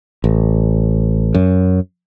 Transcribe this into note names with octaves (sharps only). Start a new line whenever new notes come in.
A1
F#2